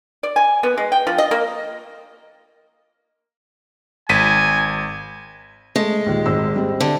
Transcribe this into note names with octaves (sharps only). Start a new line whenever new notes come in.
D5
G#5
B3
G#3
G5
F3
D#5
A#3
G#1 G#5 B6 D#7
G#3 A3
A#1 D#2
G#1 E6
G3 C4
D3